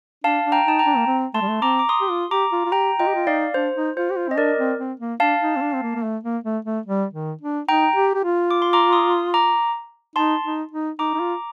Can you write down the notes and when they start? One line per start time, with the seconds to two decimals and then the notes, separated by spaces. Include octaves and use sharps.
0.24 D4 F5 A5
0.45 D4
0.52 G5 A#5
0.66 D#4 A5
0.79 G5 A#5
0.86 D4
0.97 A#3
1.07 C4
1.34 A3 A5 C6
1.41 G3
1.50 A3
1.62 C4 A#5 D6
1.79 D6
1.89 C6 D#6
2.01 G4
2.10 F4
2.30 G4 A#5 D6
2.52 F4
2.65 F4
2.72 G4 G5 A#5
2.99 F4 D#5 G5
3.07 G4
3.15 F4
3.27 D#4 D5 F5
3.54 D4 C5
3.76 D#4
3.96 F4 C5
4.11 G4
4.17 F4
4.28 C4 D#5
4.37 D4 A#4 D5
4.58 C4
4.78 C4
5.00 A#3
5.20 D4 F5 A5
5.41 D#4
5.56 C4
5.62 D4
5.75 C4
5.82 A#3
5.95 A#3
6.03 A3
6.23 A#3
6.44 A3
6.65 A3
6.86 G3
7.13 D#3
7.41 D4
7.68 D#4 G5 A#5
7.96 G4
8.14 G4
8.24 F4
8.51 D6
8.62 C6
8.73 A#5 D6
8.93 C6 D#6
9.34 A#5 D6
10.16 D#4 A5 C6
10.44 D#4
10.72 D#4
10.99 D#4 A#5 D6
11.14 D#4
11.20 F4